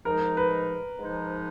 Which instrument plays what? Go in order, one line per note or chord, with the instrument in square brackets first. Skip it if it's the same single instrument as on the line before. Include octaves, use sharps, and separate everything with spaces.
[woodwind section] G#2 F3 G#3 D#4 [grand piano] A#4
[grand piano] B4
[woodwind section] G#2 F3 G#3 D#4